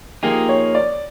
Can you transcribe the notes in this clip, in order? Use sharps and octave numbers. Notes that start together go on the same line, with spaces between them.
F3 A#3 D#4 G4 G#4
C#5
D5